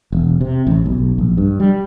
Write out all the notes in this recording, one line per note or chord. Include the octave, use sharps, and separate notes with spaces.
E1
C3
A1
B1
A#1
G2
G3